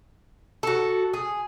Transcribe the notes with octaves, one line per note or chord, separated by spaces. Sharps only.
F#4 A4
G#4